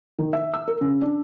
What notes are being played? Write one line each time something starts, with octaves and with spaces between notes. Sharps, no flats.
D#3
E5
E6
A#4
C#3
D4